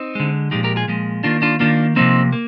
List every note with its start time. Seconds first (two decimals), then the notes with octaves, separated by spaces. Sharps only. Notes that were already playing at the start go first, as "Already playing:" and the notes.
Already playing: C4 D#4
0.15 D3 G#3
0.51 A#2 F3 G#3 D#4 G4
0.64 G4 A#4
0.76 F4 G#4
0.88 A#2 F3 G#3
1.23 D#3 A#3 D4 F4
1.42 D4 F4
1.60 D#3 A#3 D4 F4
1.96 C3 F3 A#3 C4 D#4
2.33 A#3